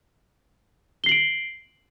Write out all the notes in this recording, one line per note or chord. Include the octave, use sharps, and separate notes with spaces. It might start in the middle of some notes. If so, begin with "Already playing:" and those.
C7 D7 F#7 G7